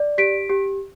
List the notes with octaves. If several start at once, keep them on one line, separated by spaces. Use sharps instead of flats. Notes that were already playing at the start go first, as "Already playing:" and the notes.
Already playing: D5
G4 B6 D7
G4